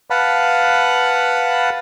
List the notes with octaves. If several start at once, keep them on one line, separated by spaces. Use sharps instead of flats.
B4 F5 F#5 A5 B5